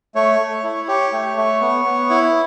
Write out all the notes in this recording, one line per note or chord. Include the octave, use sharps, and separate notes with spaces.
A3 C#5
A3
E4
G4 C#5
A3
A3
B3
B3
E4